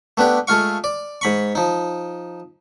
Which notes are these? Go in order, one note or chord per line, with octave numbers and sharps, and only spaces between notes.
A3 B3 D4 G4
G#3 A3 F4 F5 C#6
D5
G#2 B5 C#6
F3 D#4